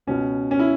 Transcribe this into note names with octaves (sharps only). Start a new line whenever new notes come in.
C#2 B2 C#4
C#4
E4